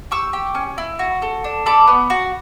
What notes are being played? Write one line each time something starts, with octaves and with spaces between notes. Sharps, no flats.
G4 C#6 E6
G4
C#4
E4
F#4
A4
D4
A4 B5 D6
B3
F#4